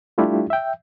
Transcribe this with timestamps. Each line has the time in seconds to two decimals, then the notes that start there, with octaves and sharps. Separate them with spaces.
0.18 G3 A3 D4 E4 F4 G4
0.50 E5 G5